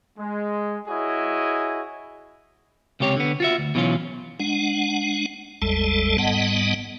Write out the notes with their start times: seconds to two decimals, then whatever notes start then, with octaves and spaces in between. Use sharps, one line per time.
0.18 G#3
0.88 E4 F#4 G#4 C#5 D#5
3.00 C#2 C3 G4 C#5
3.16 D3 B3
3.40 F4 F#4 E5
3.58 D2
3.75 B2 E3 F#3 C#4 F4
4.40 G#3 D4 F#5
5.62 A1 E2 G3 G#3 A4 A5
6.18 G#2 G3 B3 D#5 F#5 A5